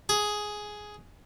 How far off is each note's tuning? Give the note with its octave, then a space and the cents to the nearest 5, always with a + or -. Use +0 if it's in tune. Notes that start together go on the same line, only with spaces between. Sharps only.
G#4 +5